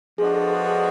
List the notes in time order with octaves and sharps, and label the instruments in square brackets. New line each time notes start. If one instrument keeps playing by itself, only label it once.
[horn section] F3 G#3 B3 D4 F#4 [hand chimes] G#4
[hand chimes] A4
A4
G#4